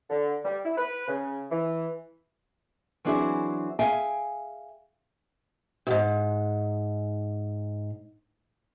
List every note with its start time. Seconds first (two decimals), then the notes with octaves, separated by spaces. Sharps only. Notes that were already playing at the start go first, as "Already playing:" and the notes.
0.10 D3
0.44 G3
0.64 E4
0.77 B4
1.08 C#3
1.50 E3
3.05 E3 F#3 C4 D4 E4 G#4
3.79 G#4 E5 F5 G5 G#5
5.87 D2 G#2